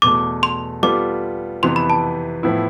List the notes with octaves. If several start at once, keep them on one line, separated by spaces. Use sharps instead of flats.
E2 B2 A3 D6
C6
G3 B3 F4 A4 D6
F2 C3 E3 B3 C6
B5
A5
A2 F3 B3 E4